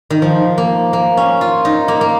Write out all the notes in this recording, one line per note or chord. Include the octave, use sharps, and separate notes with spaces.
D#3
F3
A#3
A#3
C#4
F4
D#4
A#3
A#3